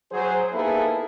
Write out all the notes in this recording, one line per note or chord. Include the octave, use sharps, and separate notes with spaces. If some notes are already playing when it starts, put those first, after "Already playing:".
F#3 G#4 C5
A#3 B3 D#4 E4 G#4 A4